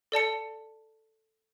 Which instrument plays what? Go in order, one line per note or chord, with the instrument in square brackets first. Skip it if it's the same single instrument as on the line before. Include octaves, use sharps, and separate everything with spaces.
[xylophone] A4 D5 A5 C#7